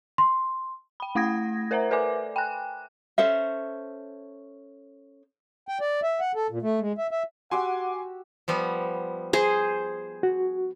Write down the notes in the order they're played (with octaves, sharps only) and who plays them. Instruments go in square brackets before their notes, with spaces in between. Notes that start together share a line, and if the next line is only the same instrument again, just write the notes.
[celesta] C6
[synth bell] G5 B5
A3 E4 F#5 D#6 G#6 A#6
A#4 C5 E5 F#5 A#5
A4 B4 D5 E5 G#5 D6
G5 G#5 F#6
[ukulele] C#4 A4 C5 E5
[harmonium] G5
D5
E5
F#5
A4
A#2
A3
G#3
E5
E5
[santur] F#4 G4 E6 [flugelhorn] F#5 [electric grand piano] G#5 C6 D6
[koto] F3 G3 B3
[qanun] G#4 C5
[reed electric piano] F#4